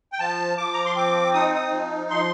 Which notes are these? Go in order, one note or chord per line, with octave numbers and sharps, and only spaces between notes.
G5
F3 A5
F3 D6
A#5
C6
C4 D6
D#4 D#6
D#6
F3
F3 C6